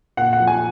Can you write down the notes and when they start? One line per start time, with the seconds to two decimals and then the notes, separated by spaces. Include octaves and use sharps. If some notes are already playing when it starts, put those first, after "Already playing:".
0.17 A#2 F#5
0.33 F#5
0.40 F3
0.47 G#5